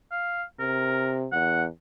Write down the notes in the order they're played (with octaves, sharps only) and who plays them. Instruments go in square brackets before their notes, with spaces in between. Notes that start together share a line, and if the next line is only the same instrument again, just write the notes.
[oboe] F5
[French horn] C3 [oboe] A#4
[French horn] E2 [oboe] F#5